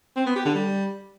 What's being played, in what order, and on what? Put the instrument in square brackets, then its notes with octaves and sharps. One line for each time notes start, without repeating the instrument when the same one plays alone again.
[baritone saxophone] C4
B3
G4
D3
G3